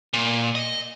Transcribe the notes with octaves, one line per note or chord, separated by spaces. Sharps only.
A#2
D#5